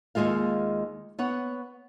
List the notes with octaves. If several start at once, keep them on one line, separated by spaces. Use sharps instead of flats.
D#2 F3 G#3 F4 F5
B3 C#5 F#5